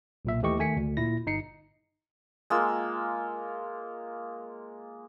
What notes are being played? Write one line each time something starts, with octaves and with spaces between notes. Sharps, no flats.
B1 A#2 E5
D#2 E3 A3 G4 D#5 C#6
D#3 A3 G#5 B6 C#7
D2
A#2 E4 A#6
G1 D#4 C7 C#7
G#3 A#3 F4 E6